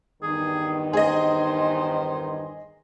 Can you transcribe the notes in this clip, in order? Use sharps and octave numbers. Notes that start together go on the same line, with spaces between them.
E2 G2 D#3 G#4
G#4 C5 D#5